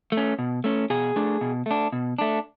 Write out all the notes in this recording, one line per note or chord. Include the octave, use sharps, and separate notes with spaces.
A3
C#4
B2
A3 C#4
B2 G#4
A3 D4
B2
A3 D4
B2
A3 D4